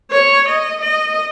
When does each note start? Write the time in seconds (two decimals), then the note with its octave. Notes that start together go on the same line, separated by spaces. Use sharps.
0.11 C#5
0.49 D#5
0.81 D#5